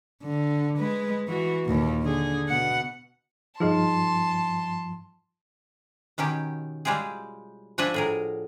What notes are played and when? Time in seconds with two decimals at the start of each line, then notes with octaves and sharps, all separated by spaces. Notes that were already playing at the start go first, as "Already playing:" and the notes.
0.23 D3
0.78 G#3 B4
1.28 E3 F#4
1.66 D#2 A#2
2.02 D3 G#4
2.49 B2 F#5
3.60 G2 F3 D#4 G#4 D#5 A5 C6
6.18 B2 D#3 C#4 G4
6.85 G3 G#3 F4 G4 G#4
7.78 F3 D4 F#4 B4 E5 G#5
7.94 A2 G#4 A#4